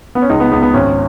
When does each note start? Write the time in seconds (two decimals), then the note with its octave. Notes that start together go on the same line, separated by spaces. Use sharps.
0.15 B3
0.22 C#4
0.30 C#2 D#4
0.40 B3
0.52 C#2 B3
0.62 B3
0.74 G#1 C#4